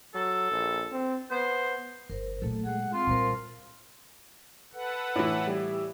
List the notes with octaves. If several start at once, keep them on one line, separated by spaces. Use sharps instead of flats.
F#3 A4
A#1
C4
B3 C5
G1 A#4 C5
A#2 F#3 A3 A4
G#3 G#4 F#5
C4 F4
A#2 G3 A#4 C5 A5
A4 B4 F#5
A2 E3
G3 G4